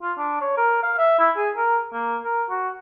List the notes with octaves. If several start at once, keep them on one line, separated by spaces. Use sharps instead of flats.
F4
D4
C#5
A#4
F5
E5
E4
G#4
A#4
A#3
A#4
F#4